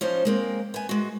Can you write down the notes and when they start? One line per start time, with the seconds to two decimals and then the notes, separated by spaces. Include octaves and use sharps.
0.01 F3 C#4 D#4 C5
0.25 G#3 A#3 C4
0.74 B3 G#5
0.89 G#3 F#4